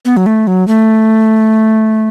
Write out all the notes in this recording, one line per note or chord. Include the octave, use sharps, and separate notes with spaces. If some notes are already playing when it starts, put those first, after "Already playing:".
B3
F#3
A3
F#3
A3